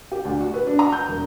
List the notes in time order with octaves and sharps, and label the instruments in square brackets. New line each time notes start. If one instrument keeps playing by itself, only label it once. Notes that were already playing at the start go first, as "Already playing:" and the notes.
[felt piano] G4
D2
F#4
B4
D4
A#5
G6
E1